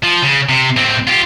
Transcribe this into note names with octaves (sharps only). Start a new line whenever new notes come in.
F3
C#3
C3
A2 C4
F4 G4